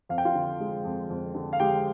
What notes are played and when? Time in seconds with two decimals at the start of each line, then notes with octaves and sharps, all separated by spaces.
0.09 F2 F5
0.18 G5
0.25 F4 F5
0.35 D3
0.60 G#3
0.85 F2
1.10 F2
1.35 D3
1.53 F5
1.60 G#3 G4 G5